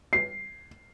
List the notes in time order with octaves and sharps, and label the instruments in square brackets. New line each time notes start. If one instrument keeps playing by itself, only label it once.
[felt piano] C7